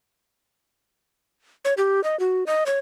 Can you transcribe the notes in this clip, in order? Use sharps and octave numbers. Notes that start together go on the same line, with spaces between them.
C#5
G4
D#5
F#4
D#5
C#5